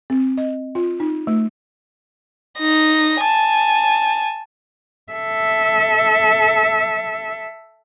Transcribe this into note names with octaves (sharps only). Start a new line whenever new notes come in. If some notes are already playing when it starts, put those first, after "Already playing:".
C4
D#5
F4
D#4
A3
D#4 A#6
G#5 A5
A4 E5